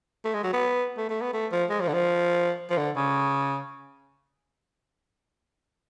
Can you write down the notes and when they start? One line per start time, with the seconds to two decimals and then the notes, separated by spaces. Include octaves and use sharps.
0.25 A3
0.34 G#3
0.44 F#3
0.53 B3
0.97 A3
1.09 A3
1.21 B3
1.34 A3
1.52 F3
1.70 G#3
1.81 F3
1.88 D3
1.94 F3
2.70 F3
2.78 D3
2.96 C#3